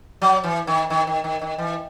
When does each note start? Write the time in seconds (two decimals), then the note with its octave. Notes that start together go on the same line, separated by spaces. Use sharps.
0.22 F#3
0.44 E3
0.67 D#3
0.90 D#3
1.07 D#3
1.24 D#3
1.41 D#3
1.58 E3